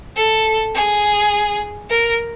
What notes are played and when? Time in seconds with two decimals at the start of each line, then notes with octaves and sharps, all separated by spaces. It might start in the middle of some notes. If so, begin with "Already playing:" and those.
0.16 A4
0.75 G#4
1.90 A#4